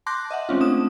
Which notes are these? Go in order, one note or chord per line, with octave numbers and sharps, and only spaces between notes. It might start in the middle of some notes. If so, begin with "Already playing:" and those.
A5 C6 D6 F#6 G6 A#6
D#5 E5 F#5
G#3 C4 C#4 F4
A3 C#4 D4 D#6 E7